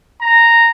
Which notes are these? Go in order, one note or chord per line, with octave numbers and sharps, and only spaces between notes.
A#5